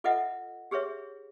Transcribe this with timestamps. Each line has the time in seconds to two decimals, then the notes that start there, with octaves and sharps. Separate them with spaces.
0.04 F4 A4 B4 D#5 E5 F#5
0.71 G4 G#4 B4 C#5 E5